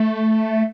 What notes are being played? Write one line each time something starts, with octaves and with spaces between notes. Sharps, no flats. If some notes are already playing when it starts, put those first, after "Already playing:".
Already playing: A3